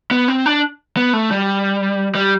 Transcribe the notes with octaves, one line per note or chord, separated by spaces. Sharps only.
B3
C4
D4
B3
A3
G3
G3